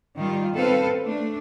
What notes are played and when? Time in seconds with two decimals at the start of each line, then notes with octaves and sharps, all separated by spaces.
0.17 D#3 G3 F4
0.54 C4 A4 B4 F5
1.05 A3 D4